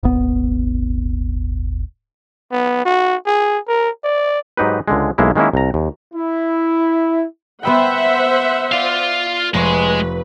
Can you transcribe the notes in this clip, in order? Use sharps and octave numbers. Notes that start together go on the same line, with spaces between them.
D#1 G#1 B3
B3
F#4
G#4
A#4
D5
G#2 F#3 D#4 G4 B4
C#2 D3 G#3
B1 G#3 A#3 E4
D#3 G#3 A#3 C#4 E4
C2 A#5
D#2
E4
B3 B4 C5 E5 F#5 G5
F4 D5 F5
F1 G#3 B4 C6 C#6